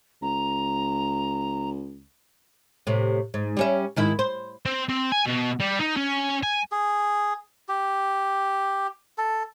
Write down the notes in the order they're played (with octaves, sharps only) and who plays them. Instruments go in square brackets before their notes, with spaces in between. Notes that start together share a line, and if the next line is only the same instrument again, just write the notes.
[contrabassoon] C#2 [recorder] A#5
[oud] A2 C3
G#2
G3 C#4 E5
G#2 D#3 E4
C5
[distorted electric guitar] C4
C4
G#5
B2
G3
D#4
C#4
G#5
[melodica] G#4
G4
A4